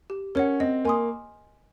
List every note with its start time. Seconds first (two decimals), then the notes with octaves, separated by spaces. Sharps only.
0.10 G4
0.35 C#4 A#4 C#5 F#5
0.60 C4 D#5
0.85 A#3 G#5 C6 D#6